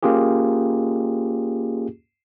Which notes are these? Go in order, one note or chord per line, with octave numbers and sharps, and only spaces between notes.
A#3 C#4 F4 G4 G#4